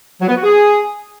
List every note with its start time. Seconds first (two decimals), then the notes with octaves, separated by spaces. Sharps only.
0.21 F#3
0.28 B3
0.36 F#4
0.43 G#4